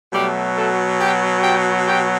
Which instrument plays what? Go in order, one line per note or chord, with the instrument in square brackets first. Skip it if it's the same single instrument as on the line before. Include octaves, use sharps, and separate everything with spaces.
[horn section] B2 F#3 G3 A3 G4
A3 A4
G4 G5
G4 G5
G4 G5